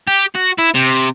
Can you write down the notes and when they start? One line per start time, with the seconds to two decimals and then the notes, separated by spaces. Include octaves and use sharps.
0.07 G4
0.35 F#4
0.58 E4
0.74 C3